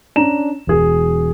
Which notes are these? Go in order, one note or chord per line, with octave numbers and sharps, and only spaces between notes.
C#4 D4 A#5 E7
E1 G#4